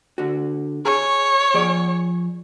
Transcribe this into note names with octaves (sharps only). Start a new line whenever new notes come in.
D3 F#4
G#4 C#5
F3 G#4 D5